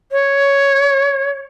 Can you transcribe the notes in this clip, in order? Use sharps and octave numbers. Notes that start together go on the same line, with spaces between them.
C#5